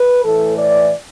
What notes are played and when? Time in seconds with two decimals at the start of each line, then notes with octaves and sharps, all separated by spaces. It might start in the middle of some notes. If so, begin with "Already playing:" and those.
Already playing: B4
0.24 A2 E3 A4
0.57 D5